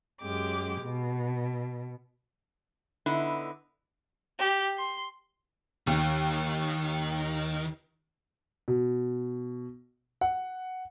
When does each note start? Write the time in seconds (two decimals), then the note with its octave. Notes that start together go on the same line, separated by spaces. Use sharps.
0.23 F#2 G#3 G4 D6
0.83 B2
3.06 D3 B3 D#4 E4
4.37 G4
4.77 C6
5.87 D#2 D#3
8.68 B2
10.21 F#5